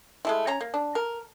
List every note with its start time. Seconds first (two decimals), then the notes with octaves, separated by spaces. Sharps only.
0.25 G#3 A3 E4
0.47 C#4 C#5 A#5
0.61 A#3
0.74 D4
0.95 A#4